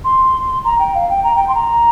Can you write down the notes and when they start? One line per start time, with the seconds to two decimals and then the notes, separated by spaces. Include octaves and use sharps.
0.04 C6
0.64 A#5
0.79 G5
0.95 F5
1.09 G5
1.23 A#5
1.35 G5
1.48 C6
1.55 A#5